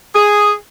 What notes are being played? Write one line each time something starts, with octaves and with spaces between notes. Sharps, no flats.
G#4